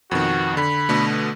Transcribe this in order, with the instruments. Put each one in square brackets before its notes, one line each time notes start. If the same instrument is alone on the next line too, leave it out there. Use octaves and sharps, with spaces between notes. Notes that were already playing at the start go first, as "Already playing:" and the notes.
[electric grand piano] F2 B2 D#3 [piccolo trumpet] F#4
[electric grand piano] D3 [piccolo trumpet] B5
[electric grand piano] B2 D3 A3